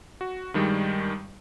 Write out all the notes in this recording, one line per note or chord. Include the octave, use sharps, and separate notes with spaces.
F#4
G2 D#3 G3 G#3